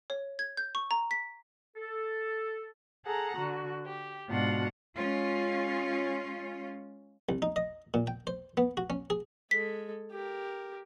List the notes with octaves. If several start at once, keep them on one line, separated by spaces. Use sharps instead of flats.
C#5
G#6
G6
C#6
A#5
B6
A4
G#4 A4 F#5 A#5
D3 F#4
G4
G#2 B2 D4 F4 F#4 F#5
G#3 C#4 F4
C2
D#4
D#5
A#2
G5
C5
B3
F#4
C#4
G#4
G#3 A4 B6
G4 A#4